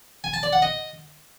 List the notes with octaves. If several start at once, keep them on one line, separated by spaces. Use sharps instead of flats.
G#5
A5
D5
F#5
D#5